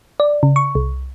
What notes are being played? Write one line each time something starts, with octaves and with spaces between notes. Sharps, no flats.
D5
C#3
C#6
C2